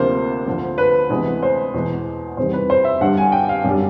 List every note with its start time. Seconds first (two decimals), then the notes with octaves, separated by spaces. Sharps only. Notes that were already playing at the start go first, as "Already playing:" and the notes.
Already playing: D2 C3 F3 A#3 C5
0.46 D2 D3 F3
0.78 B4
1.10 D2 C3 E3 G#3 B3
1.43 C5
1.74 E2 B2 G#3
2.37 E2 C3 D#3 G3 C5
2.53 B4
2.70 C5
2.85 E5
3.01 G2 D3 G3 F#5
3.17 G#5
3.32 G5
3.49 F5
3.64 F#2 D3 G3